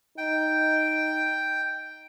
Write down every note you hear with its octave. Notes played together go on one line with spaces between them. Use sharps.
D#4 G5